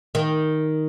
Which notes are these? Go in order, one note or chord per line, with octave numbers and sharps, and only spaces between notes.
D#3